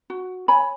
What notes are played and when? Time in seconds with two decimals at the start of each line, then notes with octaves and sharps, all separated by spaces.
0.10 F#4
0.48 C#5 G#5 B5